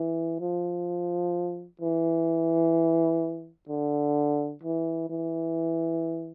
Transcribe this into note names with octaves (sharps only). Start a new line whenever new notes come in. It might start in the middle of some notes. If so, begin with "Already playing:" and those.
Already playing: E3
F3
E3
D3
E3
E3